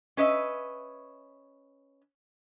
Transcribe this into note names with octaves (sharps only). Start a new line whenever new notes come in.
C#4 B4 D#5 E5